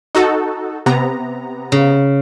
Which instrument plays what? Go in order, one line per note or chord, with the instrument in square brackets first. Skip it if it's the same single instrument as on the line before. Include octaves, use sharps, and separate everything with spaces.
[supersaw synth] D#4 F#4 A4
C3 B3 A#5
[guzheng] C#3